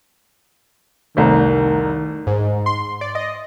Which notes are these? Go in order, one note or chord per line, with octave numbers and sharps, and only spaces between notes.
F1 C2 D#3 A3
G#2
C6
D5
D#5